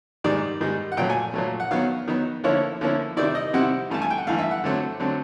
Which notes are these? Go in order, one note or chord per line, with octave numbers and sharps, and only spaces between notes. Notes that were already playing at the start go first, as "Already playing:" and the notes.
G#2 D#3 G3 D5
G#2 D#3 G3
F#5
A#2 F#3 A3 G5
G#5
A#2 F#3 A3
F#5
D#3 F#3 B3 F5
D#3 F#3 B3
D3 F3 A#3 C#4 E4 C#5
D3 F3 A#3 C#4 E4
C3 D#3 G3 C4 E4 D5
D#5
C3 D#3 G3 C4 E4 F#5
G2 E3 A3 A5
G#5
G5
F#5
G2 E3 A3 F5
E5
F#5
D3 F#3 A3 C4
D3 F#3 A3 C4